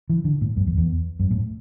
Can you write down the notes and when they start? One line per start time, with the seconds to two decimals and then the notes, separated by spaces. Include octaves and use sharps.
0.09 E3
0.25 D3
0.41 A2
0.57 F#2
0.67 E2
0.77 E2
1.20 F#2
1.31 A2